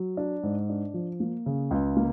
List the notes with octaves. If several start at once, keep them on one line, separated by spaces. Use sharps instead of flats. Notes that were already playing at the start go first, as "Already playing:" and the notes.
Already playing: F#3
D4
G#2
D4
F3
A#3
C#3
C#2
A#3